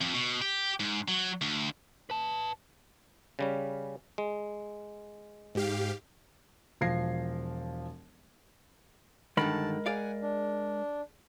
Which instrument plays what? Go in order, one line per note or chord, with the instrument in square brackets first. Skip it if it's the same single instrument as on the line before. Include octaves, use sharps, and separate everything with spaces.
[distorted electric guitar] F2
B2
G4
G#2
F#3
D2
[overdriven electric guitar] B4 A5
[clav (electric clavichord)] C#3 G3 C#4
G#3
[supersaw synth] G#2 G4 F5
[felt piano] E1 F3 G#6 A#6 C7
[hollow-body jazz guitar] G2 D3 D#3 [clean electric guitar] G#3 A#4 B5 [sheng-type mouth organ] A5
[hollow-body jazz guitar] G#4 D5 F5 [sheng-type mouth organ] F#5 G#5
[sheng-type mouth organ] D4